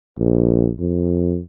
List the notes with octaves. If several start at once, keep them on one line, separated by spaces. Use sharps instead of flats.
A#1
F2